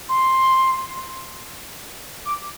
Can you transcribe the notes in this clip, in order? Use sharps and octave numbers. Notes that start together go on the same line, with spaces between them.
C6
D6